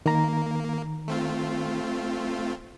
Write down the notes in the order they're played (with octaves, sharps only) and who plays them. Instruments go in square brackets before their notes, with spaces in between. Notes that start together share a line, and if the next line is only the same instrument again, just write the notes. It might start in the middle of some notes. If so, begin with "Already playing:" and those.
[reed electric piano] D#3 A#5 [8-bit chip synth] A#3
[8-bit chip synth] A3 C4 F4